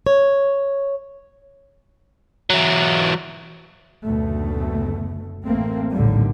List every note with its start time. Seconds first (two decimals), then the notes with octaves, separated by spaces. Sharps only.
0.06 C#5
2.50 E3 F#3
4.04 F#1 D2 B2 A3
5.46 A1 A3 A#3 C4
5.93 A#1 D#2 A2 D3 G3